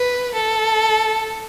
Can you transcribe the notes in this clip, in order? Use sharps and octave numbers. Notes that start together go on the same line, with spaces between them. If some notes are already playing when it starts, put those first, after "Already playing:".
Already playing: B4
A4